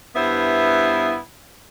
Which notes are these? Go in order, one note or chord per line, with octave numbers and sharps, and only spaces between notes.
G2 B3 E4 C5 E5